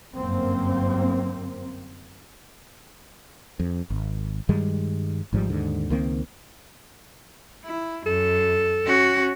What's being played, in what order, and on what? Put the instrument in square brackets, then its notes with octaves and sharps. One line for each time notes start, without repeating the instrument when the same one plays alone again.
[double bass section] G1 F#2 A#3 C4
[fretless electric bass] F2
G#1
G2 D#3 G3 G#3
G#1 G#2 F3 G3
D#2 G#2 D3
C#2 D#3 A#3 C4
[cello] E4
[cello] F#2 [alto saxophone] A4
[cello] C#4 F#4